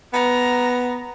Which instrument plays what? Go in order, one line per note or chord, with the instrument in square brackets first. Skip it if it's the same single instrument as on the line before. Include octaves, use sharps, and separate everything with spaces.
[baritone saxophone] B3 [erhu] A#5